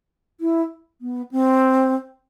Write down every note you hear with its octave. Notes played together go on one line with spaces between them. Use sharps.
E4
B3
C4